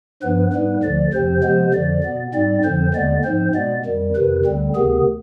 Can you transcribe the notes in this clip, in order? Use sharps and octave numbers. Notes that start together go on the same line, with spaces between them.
G2 F3 B3 B4
G#2 G3 B3 B4
D2 D3 F3 D5
F2 C3 F3 C4 C5
C3 F3 G#3 B3 C5
F2 D3 F3 D5
B2 B3
G#2 G3 C4 D5
F2 D3 F3 C4 C5
D#2 D3 G#3 B3 D5
G#2 F3 C4 C5
B2 G#3 B3 D5
F2 D#3 G3
F2 C3 D#3 B4
D2 D3 G3 C4
D2 C3 D#3 B3 G#4